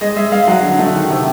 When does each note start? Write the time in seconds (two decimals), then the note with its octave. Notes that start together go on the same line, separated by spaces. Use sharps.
0.01 G#3 D#5
0.17 G#3 E5
0.32 G#3 F5
0.47 F#3 F#5
0.63 D3
0.79 A3
0.95 D#3
1.10 C3